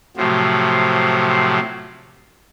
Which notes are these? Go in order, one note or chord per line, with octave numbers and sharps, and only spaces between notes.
A2 C3 F3 F#3